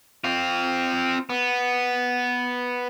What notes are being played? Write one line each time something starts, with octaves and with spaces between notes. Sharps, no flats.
C4 F4
B3